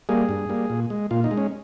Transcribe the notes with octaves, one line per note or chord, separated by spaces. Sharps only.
G3 A#3 G#4
G2
G3 A#3
A#2
G#3
A#2 F4
D#4
G#3
C#4